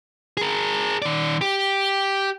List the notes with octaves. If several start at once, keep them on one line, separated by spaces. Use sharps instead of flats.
G#4 A#4
D#3 D5
G4